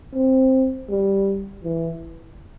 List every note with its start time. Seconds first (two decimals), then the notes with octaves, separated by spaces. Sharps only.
0.15 C4
0.90 G3
1.64 E3